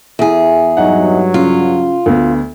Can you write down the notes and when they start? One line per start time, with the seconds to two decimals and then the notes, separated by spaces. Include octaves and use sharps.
0.19 E2 G#4
0.77 G2 F#3 D#4 F#5
1.34 C#3 F4
2.06 D2 B3